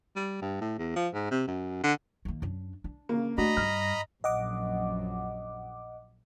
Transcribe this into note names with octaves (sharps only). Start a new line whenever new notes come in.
G3
G2
A2
E2
F3
G#2
C3
F#2
D3
D#3 A#3
F#2 D4
D4
C#3 A#3
A3 D4 F#4 D#5 A#5 B5
G2 F6
A#1 F#2 D#5 F#5 D6